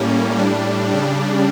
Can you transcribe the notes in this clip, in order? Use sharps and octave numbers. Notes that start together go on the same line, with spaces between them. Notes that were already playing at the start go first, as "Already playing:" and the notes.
Already playing: A2 G3 A#3 C#4
A2 G3 D4
C#3 G3 D4